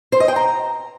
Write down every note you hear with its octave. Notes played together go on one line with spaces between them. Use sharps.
C5
D#5
G5
A#5